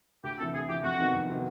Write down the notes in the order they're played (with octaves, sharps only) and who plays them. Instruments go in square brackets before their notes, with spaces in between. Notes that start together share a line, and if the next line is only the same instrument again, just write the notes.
[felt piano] D2 [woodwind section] G4
[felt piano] C3 [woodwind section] A4
[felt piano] E3
[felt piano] D2 [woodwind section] G#4
[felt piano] C3 E3 [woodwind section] G4
[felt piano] F2 [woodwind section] F#4
[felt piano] C3 D#3 F#3 B3
F2
C3 D#3 F#3 B3